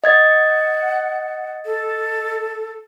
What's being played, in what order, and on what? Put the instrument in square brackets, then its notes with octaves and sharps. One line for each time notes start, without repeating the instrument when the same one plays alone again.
[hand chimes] D#5 G#6 A6 [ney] F#5
[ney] A4